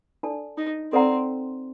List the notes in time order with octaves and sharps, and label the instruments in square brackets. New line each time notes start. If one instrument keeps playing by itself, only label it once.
[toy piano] D4 A4 D5 A5
[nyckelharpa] D#4
[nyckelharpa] C4 [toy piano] A4 D5 F#5 A#5